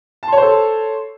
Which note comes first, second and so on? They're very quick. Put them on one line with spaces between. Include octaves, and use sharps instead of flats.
A5 C6 C#5 C5 A4